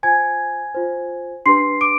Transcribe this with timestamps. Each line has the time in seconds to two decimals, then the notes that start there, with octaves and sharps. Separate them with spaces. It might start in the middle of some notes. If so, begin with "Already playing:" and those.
0.03 F4 C5 G#5 G#6
0.74 F4 C5
1.46 D4 G4 B4 C6 C7
1.81 D6 D7